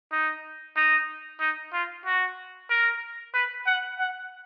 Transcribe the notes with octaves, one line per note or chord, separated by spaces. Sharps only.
D#4
D#4
D#4
F4
F#4
A#4
B4
F#5
F#5